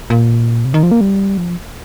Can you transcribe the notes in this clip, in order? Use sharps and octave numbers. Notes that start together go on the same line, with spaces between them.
A#2
C3
D#3
F3
A#3
G3
F3